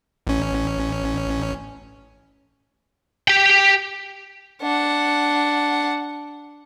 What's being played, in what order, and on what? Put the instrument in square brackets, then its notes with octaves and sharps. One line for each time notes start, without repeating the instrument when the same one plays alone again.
[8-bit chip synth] A1 C#4
[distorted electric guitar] G4 G5
[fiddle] D4 F#5